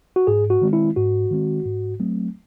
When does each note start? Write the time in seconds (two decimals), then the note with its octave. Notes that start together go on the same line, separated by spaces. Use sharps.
0.16 F#4
0.27 G#2 G#4
0.50 F#4
0.62 D#3 G#3 C4
0.73 E4
0.96 G#2 F#4
1.31 D#3 G#3 C4
1.66 G#2
2.00 F#3 A3 C4